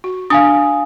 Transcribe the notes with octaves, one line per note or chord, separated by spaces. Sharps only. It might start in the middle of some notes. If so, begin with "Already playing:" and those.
F#4
D4 F5 G#5 D#6